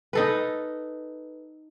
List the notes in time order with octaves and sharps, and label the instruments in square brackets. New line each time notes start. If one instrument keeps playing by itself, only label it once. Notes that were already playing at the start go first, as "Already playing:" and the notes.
[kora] D#4 A4 B4